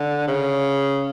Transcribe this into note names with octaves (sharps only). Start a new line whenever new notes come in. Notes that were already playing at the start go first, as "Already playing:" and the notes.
Already playing: D3
C#3